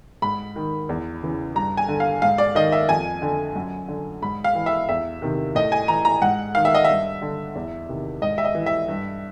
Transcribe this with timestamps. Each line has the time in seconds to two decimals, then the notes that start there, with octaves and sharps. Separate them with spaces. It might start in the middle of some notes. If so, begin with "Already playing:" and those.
0.22 G#2 B5
0.56 D#3
0.89 E2
1.23 C#3 E3
1.55 G2 A#5
1.77 G#5
1.89 D3
2.00 F5
2.22 G#2 F5
2.38 D5
2.55 D#3 D#5
2.72 E5
2.89 F2 G#5
3.22 D3
3.56 F#2
3.88 D3
4.22 G#2 B5
4.44 F5
4.55 E3
4.66 E5
4.89 E2 E5
5.22 C3 D#3
5.55 A2 D#5
5.72 G#5
5.88 E3 A#5
6.05 A#5
6.22 G#2 F#5
6.55 D#3 F5
6.65 E5
6.75 D#5
6.85 G2 E5
7.22 D3
7.55 E2
7.89 C3 D#3
8.22 G#2 D#5
8.38 E5
8.44 D#5
8.55 E3
8.66 E5
8.89 G2